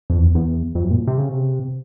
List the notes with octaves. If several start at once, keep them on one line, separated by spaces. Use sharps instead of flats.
F2
E2
E2
F2
F#2
A#2
C3
C#3
C3